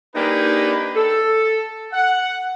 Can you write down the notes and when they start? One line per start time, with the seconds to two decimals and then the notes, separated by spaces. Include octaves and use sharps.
0.14 A#3 D4 D#4 G4 G#4 B4
0.95 A4
1.92 F#5